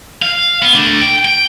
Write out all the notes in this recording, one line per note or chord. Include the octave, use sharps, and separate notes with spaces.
F5
B3
A3 D4
G5
G5